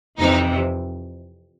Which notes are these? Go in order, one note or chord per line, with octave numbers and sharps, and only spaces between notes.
F2 C3 E3 D#4